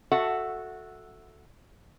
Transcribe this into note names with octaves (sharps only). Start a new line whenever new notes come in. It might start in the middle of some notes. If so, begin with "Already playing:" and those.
F#4 A4 E5 F#5